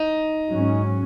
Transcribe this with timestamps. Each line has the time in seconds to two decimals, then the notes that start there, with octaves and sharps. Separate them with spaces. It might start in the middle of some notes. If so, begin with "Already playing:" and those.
Already playing: D#4
0.50 G#2 F#3 C#4